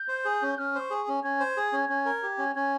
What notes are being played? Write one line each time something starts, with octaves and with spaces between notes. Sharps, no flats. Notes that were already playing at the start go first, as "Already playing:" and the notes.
Already playing: G6
C5
G#4
C#4
C#4 F6
C5 C#6
G#4
C#4
C#4 G#6
C5
G#4
C#4
C#4
A#4
G4
C#4
C#4 G#6